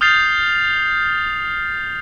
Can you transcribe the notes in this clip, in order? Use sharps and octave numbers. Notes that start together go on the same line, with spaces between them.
D#6 F6 G6 A6 C7 F7